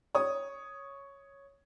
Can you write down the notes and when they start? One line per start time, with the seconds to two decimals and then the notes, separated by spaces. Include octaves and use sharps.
0.15 C#5 D#6